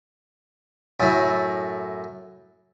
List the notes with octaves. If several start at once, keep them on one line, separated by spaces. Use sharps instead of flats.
F#2 A2